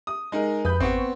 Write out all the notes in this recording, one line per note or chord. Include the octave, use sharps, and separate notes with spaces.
D#6
G#3 D#4 A#4
F2 B4 B5 D#6 G6
G#1 B3 C4 C#6